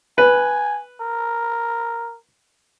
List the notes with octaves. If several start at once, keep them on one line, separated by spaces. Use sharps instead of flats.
B4 G#5
A#4